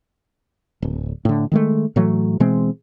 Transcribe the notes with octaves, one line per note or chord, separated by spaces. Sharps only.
D1
A2 D3
D#3 G#3 A3
A2 E3 F#3 A3
B2 E3 G#3 C4